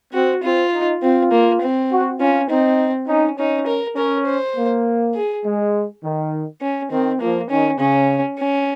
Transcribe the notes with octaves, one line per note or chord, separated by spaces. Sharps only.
C4 F#4
C4 F4
D#4
C4 F4
A#3
C4
F#4
C#4 F4
C4 D#4
C#4 D#4
C#4 D#4
A#4
C#4 A#4
C5
A#3
G#4
G#3
D#3
C#4
D#3 C4
F3 A#3
D#3 C#4
C#3 C#4
C#4